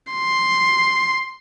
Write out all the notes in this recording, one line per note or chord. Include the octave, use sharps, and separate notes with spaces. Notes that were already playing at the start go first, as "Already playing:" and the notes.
C6